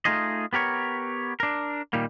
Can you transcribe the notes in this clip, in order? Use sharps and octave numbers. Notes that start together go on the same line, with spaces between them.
A3 D#4 F4 G#4 D#5
B3 G4 A#4 C#5
D4 A#4
A#2 D#3 G3 A#3